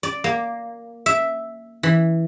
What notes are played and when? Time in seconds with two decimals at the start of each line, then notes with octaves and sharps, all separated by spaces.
0.03 D5
0.24 A#3
1.06 E5
1.83 E3